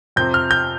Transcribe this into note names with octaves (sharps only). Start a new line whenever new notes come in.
F2 C3 F3 C4 G6
F6
G6